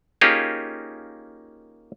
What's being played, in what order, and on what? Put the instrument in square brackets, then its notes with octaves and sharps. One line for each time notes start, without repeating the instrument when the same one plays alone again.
[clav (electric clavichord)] A#3 C#4 D#4 F4 G4 G#4